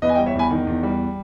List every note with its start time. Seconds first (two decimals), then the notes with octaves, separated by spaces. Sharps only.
0.02 E2 B4 D#5
0.09 G#5
0.14 D#5 G5
0.18 G3
0.26 C#5 E5
0.35 E2 G#5 B5
0.51 D#3
0.67 E2
0.83 G3